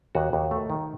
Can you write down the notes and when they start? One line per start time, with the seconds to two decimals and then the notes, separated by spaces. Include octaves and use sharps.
0.15 D#2 F#4
0.33 D#2
0.51 A3
0.70 D#3